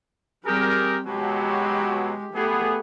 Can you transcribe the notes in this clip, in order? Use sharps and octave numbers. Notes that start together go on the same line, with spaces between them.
G3 C4 G4 G#4 A#4
B2 F#3 G#3 G4
A3 B3 G4 G#4